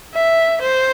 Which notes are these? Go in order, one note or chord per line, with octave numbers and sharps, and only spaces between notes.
E5
C5